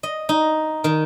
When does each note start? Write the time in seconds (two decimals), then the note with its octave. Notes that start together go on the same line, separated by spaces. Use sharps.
0.03 D#5
0.29 D#4
0.84 D#3